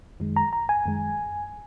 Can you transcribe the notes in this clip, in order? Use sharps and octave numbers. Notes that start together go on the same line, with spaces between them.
F#2 D#3 G#3
A#5
A#5
G#5
F#2 D#3 G#3